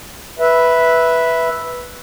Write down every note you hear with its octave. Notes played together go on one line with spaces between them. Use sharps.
B4 E5